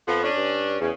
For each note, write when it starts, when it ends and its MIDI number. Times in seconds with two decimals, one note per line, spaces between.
0.07 0.28 41
0.07 0.21 53
0.07 0.21 59
0.23 0.76 61
0.23 0.76 62
0.36 0.76 43
0.81 0.91 40
0.81 0.92 49